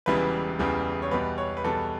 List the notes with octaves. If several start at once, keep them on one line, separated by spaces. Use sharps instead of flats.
E1 E2 C#3 E3 G3 B4
E1 E2 C#3 E3 G3
C#5
E2 B2 G3 B4
C#5
B4
E2 B2 G3 A4